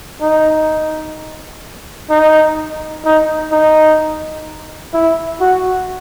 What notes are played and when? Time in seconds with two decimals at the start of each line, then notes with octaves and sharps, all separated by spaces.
0.22 D#4
2.10 D#4
3.05 D#4
3.52 D#4
4.94 E4
5.41 F#4